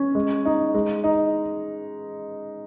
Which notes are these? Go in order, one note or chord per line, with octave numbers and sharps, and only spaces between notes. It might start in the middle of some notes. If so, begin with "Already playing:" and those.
Already playing: C#4
G#3
D#4
G#3
D#4